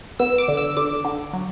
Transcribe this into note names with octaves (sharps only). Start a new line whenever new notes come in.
B3 E6
D6
D3
E6
D3 D6
D3
F#3